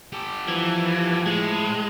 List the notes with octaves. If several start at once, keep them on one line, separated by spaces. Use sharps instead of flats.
G4 A4
E3 F3
A2 G#3